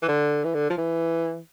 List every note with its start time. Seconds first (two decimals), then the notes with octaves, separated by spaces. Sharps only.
0.02 E3
0.08 D3
0.44 E3
0.54 D3
0.70 F3
0.77 E3